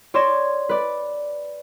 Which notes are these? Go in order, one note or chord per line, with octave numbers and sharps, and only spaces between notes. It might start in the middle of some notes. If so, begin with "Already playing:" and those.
C#5 D5 C6 G#6 A#6 E7
B4 D5